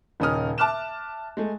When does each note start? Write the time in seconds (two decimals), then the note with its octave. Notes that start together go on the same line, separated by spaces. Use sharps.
0.20 D#1 C#3 C#4 D#4 D#6 F6
0.58 E5 A5 D6 F6 F#6 E7
1.37 G#3 A3